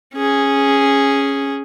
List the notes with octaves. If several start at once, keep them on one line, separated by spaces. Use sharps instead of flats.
C#4 G#4